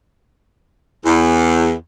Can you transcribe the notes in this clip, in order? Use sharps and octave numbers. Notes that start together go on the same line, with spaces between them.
E2